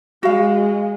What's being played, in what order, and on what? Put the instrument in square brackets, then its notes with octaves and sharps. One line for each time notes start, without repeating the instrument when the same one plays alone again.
[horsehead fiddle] G#3 [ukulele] F#4 F5